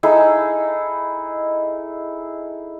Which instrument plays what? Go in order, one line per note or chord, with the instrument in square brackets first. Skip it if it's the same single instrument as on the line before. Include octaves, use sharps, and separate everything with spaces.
[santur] D#4 E4 G#4 A4